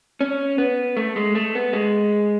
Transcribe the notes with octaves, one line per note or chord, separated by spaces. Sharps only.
C#4
B3
A3
G#3
A3
B3
G#3